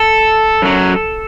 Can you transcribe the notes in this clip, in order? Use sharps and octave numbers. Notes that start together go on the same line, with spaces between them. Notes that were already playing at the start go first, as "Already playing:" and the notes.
Already playing: A4
F#2 F#3